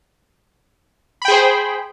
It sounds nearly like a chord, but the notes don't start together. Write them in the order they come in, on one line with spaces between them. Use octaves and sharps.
B5 G5 G#4 C5